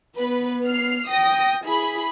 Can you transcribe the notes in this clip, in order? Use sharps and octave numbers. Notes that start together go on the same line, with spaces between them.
B3 B4
F6 C7
G5 D#6 A#6
E4 G#4 B5